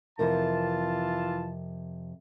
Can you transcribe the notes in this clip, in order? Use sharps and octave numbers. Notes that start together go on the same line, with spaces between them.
F2 C3 E3 F4 A#4 A5